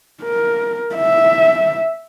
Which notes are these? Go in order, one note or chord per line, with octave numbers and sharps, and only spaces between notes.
A#4
E5